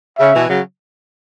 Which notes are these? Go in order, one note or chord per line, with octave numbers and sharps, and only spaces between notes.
C#3 E5
B2 E3
C#3 F#3